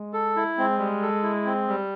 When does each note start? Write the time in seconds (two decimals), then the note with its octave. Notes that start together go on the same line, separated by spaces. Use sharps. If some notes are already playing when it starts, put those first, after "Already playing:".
Already playing: G#3
0.13 A4
0.36 E4
0.57 G#3 C4
0.79 G3
1.02 A4
1.23 E4
1.46 C4
1.68 G3